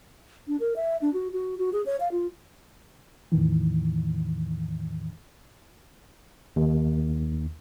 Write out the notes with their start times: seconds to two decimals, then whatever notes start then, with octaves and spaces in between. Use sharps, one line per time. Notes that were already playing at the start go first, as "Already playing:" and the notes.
0.48 D4
0.60 A#4
0.76 E5
1.01 D4
1.13 F#4
1.33 F#4
1.58 F#4
1.73 G#4
1.86 C#5
2.00 F5
2.12 F4
3.32 E2 A2 D#3 E3
6.56 D#2